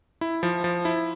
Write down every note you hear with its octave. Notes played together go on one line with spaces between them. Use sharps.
E4
F3
F3
E4